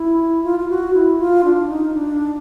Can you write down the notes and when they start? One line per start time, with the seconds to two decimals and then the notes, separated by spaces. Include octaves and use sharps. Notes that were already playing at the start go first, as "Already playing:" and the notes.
Already playing: E4
0.44 F4
0.59 F4
0.69 F#4
0.94 E4
1.19 F4
1.44 D4
1.69 D#4
1.94 D4